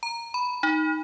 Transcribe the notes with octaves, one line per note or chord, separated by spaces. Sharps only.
A#5
B5
D#4